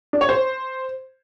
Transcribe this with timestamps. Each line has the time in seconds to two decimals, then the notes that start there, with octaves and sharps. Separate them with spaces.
0.13 D4
0.21 C#5
0.29 C5